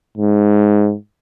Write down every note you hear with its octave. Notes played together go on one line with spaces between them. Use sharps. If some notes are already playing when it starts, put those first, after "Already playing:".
G#2